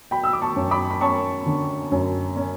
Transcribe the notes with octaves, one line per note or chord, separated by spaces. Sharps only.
F#3 G5 B5
E6
D6
A5 C#6
F#2
B5 D6
B5
C#4 A5 C#6
D3
F#2
C#4